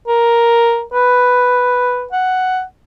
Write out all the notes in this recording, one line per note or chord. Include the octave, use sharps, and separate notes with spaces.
A#4
B4
F#5